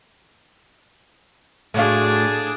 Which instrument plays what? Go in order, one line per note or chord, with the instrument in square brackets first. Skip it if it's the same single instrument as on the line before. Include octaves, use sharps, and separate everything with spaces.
[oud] A2 F#4 F5 [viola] D4 G#4